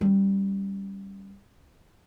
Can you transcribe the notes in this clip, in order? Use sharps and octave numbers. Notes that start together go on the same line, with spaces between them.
G3 C#4